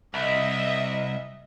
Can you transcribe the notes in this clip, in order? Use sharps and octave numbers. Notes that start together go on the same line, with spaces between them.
C2 D#5 E5